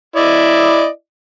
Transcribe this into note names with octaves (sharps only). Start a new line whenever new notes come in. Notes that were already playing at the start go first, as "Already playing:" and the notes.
E4 D5 D#5